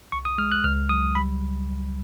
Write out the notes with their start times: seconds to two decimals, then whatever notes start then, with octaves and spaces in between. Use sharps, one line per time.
0.12 C2 C#6
0.25 D#6
0.38 G#3 F6
0.52 F#6
0.64 C#2 F6
0.89 F#3 D#6
1.15 G3 B5